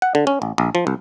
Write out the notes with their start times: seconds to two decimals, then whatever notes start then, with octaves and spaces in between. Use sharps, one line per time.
0.02 F#5
0.15 D3
0.27 C#4
0.42 A1
0.58 A#1
0.75 F3
0.87 C2